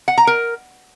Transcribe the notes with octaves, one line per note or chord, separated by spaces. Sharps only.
F#5
A#5
A#4